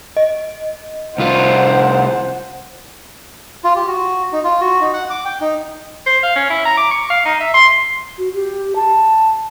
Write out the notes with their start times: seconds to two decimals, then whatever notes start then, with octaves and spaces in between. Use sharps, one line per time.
0.17 D#5
1.18 C2 F4 C5 F#5
3.64 F4
3.76 G4
3.87 F#4
4.32 D#4
4.44 F4
4.61 F#4
4.81 D#4
4.93 F#5
5.10 D6
5.25 G5
5.41 D#4
6.07 C5
6.23 F5
6.36 C#4
6.50 E4
6.65 A#5
6.77 D6
6.91 C#6
7.10 F5
7.25 D#4
7.40 E5
7.54 C6
8.18 F#4
8.34 G4
8.76 A5